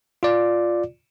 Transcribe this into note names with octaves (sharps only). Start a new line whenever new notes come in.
F4 D5